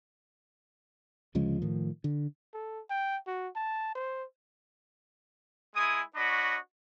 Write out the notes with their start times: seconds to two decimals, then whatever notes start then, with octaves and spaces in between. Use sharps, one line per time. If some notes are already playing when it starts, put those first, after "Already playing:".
1.35 D2 C#3 F3 G#3
1.62 A2 D#3 F3
2.04 D3
2.54 A4
2.90 G5
3.27 F#4
3.56 A5
3.95 C5
5.75 G#3 E4 G#5 D#6
6.15 D4 F#4 C#5 D#5 B5